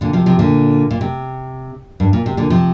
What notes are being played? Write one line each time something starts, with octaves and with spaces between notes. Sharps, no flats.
A#2 D3
C3 F3
C3 F3
A#2 D3
A#2
C3
G2
A#2
C3
A#2 D3
C3 F3